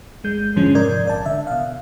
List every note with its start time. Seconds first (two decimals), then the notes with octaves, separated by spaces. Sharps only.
0.24 G1 G#3 G6
0.56 F2 G#2 D3 F3 G#3 C#4
0.75 G#2 C3 A#4 D5 G6 G#6
1.05 A#1 D5 A5
1.25 D3 E5
1.47 B2 F5